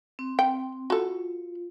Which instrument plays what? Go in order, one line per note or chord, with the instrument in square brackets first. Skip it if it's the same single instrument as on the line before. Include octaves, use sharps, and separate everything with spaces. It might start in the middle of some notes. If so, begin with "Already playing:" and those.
[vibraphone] C4
[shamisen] G5
[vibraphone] F4 [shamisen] F#4 A4